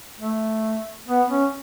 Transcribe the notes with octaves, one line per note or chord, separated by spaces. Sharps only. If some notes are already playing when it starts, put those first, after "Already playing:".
A3
B3
C#4